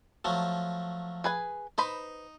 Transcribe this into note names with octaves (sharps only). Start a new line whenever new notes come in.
F3 F#3 A3
G#4 B4 G#5
D#4 B4 C5 B5